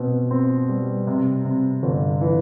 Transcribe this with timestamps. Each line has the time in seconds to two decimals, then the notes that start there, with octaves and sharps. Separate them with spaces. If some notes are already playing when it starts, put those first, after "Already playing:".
Already playing: B2 C4
0.31 C4
0.69 G3
1.07 C3
1.45 C3
1.83 G1
2.21 E3